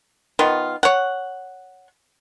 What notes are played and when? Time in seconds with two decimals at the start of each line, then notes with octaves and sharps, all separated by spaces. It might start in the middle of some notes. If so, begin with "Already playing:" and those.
0.39 D#3 B3 F4
0.83 C#5 F#5